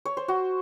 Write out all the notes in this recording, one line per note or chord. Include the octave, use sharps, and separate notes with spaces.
C#5
C5
F#4